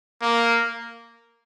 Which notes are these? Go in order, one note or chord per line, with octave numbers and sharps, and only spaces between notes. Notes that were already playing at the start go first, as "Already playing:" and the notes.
A#3